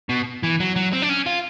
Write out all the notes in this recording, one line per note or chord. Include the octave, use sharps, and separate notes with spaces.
B2
E3
F#3
F#3
C4
D4
C#4
F4